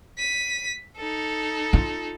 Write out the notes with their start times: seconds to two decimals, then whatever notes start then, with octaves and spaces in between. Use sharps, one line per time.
0.18 B6 D#7
0.97 D#4 A4
1.73 F4